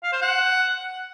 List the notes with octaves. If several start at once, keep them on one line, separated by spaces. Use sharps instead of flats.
F5
C5
F#5